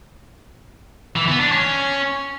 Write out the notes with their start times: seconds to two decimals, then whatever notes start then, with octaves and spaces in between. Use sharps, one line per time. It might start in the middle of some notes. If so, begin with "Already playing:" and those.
1.16 E3
1.28 B3
1.40 D4
1.52 C#4